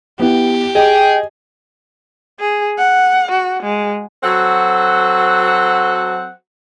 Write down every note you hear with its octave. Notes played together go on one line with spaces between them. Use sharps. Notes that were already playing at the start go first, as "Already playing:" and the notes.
B3 E4 G4
G#4 D#5 G5
G#4
F#5
F#4
G#3
F#3 C4 F#4 A4 F#5